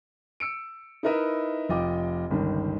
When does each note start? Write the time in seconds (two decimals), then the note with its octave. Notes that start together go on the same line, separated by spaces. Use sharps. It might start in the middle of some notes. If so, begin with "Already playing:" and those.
0.40 E6 C#7 D7
1.03 D#4 E4 A#4 B4 D#5 E5
1.69 F1 F4 D#5 G5 D6
2.31 G1 C#2 D#3